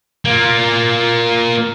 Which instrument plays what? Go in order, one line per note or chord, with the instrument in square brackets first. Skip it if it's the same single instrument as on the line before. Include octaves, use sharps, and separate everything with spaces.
[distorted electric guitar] A#3 F4